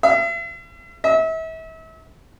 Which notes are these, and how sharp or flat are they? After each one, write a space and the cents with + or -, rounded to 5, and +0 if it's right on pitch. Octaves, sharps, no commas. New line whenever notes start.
E5 +45
E5 -35